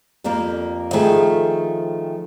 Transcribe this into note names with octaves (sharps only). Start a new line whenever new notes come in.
F2 G3 A#3 A#4
D#3 F3 A3 G4 G#4 B4